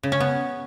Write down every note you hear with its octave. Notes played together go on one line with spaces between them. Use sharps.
C#3
C#4
B3